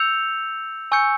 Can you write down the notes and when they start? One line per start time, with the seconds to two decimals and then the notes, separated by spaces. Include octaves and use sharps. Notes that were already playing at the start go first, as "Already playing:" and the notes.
Already playing: E6 G6 C#7 F7
0.92 G#5 C#6 E6 G6 C#7